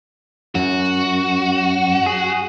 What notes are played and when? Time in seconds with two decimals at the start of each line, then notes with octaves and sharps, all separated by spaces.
0.55 F#2 F#4
2.06 G#4